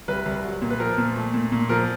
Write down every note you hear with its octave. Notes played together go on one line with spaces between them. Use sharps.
C2 B4
C2
F#3
A#2
B4
F3 A#4
A#2
A3
A#2
A#2
F3 A#4